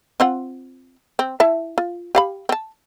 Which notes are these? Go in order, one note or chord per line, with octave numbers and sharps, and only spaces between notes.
C4 F4 F#5
C4
E4 E5 A5
F4
G4 F5 B5
C4 A5